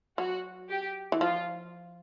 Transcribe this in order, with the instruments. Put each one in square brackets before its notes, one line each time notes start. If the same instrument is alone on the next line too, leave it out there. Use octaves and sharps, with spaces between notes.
[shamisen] F#3 [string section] F#4
[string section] G4
[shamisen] E3
[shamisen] F3 [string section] F4